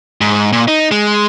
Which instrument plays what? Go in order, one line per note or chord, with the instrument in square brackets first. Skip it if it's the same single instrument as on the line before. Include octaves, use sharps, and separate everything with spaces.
[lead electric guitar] G#2
A#2
D#4
G#3